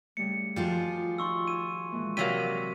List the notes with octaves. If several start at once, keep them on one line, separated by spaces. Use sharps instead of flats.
C#3 G3 A3 C#7
D#3 F3 G3 F4 F#4 G#4 G5
D#4 C6 C#6 E6
G#5 E6 D#7
A#2 E3 G#3
C3 F#3 A#3 G4 C#5 D5 B6 D#7